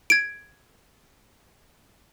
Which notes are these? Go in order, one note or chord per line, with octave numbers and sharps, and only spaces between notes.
G#6 D7